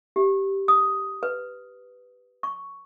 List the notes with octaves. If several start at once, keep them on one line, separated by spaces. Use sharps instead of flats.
G4
D#6
B4
C#6